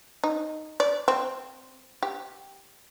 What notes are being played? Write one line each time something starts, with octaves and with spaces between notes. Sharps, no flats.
D#4
D5
C4
G4